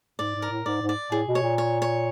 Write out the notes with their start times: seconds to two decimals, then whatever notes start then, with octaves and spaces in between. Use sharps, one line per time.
0.19 G#2 D5
0.35 G#2
0.42 A#4
0.50 A2
0.66 G#2 D5
0.82 G#2
0.89 D5
1.12 A2 G#4
1.28 B2
1.35 C#5
1.42 A#2
1.58 C#5
1.82 C#5